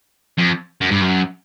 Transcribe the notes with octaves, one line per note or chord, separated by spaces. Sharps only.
F2
F#2
G2
F#2